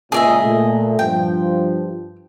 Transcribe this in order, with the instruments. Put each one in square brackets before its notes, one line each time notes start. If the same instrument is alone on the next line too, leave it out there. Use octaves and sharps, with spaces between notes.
[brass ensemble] C#2 A#2 [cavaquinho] G#4 D#5 E5
[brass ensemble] A#2 A3
[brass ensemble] G2 F3 [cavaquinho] G5